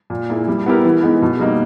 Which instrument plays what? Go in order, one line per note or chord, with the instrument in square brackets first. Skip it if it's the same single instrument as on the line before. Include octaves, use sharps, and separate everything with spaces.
[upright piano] A#2
A#3 E4 G#4
G3
B3 E4 G4 A#4
E3
G#3 B3 D#4
B2
G3 A#3 D#4